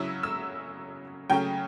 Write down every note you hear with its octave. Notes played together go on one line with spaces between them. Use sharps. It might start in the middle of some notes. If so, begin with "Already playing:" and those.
Already playing: C#3 F#3 C#4 E4 E6
E6
C#3 F#3 A3 C#4 G5